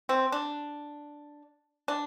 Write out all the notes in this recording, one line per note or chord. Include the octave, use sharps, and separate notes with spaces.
C4
D4
D4